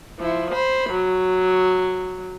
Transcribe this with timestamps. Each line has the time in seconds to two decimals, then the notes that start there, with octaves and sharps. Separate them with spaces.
0.19 F3 E4
0.53 C5 B5
0.90 F#3